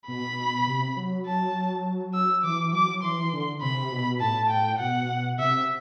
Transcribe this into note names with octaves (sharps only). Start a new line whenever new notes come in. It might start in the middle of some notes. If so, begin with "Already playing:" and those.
B2 B5
C3
F#3
A5
E6
E3 D6
F#3 D6
E3 C6
D3
C3 B5
B2
A2 A5
G5
B2 F#5
C3 E5